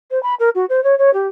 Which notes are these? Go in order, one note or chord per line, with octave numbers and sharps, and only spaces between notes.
C5
B5
A#4
F#4
C5
C#5
C#5
G4